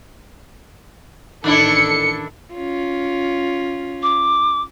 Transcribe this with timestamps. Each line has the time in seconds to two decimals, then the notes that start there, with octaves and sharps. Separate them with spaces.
1.44 A1 D#3 D4 E4 A4 C#7
2.54 C#4 F4
4.03 D6